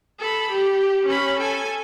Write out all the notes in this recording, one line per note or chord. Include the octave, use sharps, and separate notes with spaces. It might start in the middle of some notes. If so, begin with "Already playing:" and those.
A4 B5
G4
C#4 B5
A4 G#5